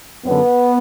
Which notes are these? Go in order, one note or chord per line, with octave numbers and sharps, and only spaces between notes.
F#2 D3 B3